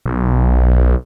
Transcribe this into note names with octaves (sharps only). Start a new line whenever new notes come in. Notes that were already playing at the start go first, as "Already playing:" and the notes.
B1